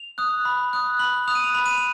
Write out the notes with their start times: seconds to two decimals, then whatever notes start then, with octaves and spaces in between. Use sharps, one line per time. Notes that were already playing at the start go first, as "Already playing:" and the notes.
Already playing: F7
0.18 D#6 F#6
0.45 B5
0.73 D#6 F#6
0.99 B5 F#7
1.28 D#6 F#6 F7
1.35 D#7
1.44 F7
1.54 B5 F7
1.66 D#7
1.78 F7